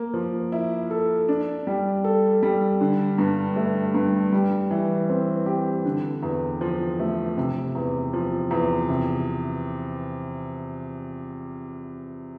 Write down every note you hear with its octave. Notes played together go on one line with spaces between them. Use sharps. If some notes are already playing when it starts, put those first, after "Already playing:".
Already playing: A#3
F3
E4
A4
D4
G3
A4
G3
D3
G2
A3
G2
G3
E3
C4
G4
D3
E2
F3
A3
C3
E2
F3
E2
C3